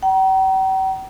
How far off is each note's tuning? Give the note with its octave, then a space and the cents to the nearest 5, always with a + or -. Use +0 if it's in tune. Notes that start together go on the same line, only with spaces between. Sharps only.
G5 -45 A#5 +30